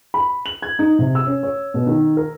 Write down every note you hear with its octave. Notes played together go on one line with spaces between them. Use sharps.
B5
F#7
G#6
D#4
C3
E6
C#4
C#5
B2
D#3
A#4